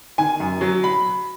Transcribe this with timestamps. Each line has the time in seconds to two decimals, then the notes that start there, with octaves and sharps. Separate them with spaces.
0.18 D#3 G#5
0.40 F#2
0.61 F#3
0.84 B5